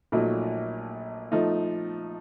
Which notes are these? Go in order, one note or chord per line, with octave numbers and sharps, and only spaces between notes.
A#1 A#2 F#3 A3 D#4
F3 A3 D#4